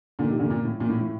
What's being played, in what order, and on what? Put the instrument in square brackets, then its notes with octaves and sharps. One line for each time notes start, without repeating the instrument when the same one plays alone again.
[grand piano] A#2 D3
C3 D#3
A#2 D3
A#2
A2
A#2
A2
A2